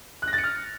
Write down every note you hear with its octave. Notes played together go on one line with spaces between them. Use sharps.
F#6
A#6
A6
C#7
F6